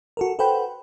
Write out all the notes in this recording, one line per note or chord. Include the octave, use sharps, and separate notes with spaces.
F#4 A4 A#4
A4 B4 C5 F#5 G5 B5